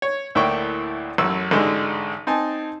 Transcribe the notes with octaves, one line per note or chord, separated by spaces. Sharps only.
C#5
D2 A2 A#3 E4 G5 C#6
A1 F#2 E6
A1 G#2 D3 G#3
C4 D#4 G#5 A5